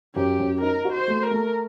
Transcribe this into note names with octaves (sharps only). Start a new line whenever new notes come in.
F#2 G4
F#2
D#4 A#4
F#4
C5
A3
A#4
A3